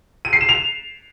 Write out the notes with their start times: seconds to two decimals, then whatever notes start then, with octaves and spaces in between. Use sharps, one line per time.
0.25 D#7
0.33 C7
0.41 E7
0.49 F7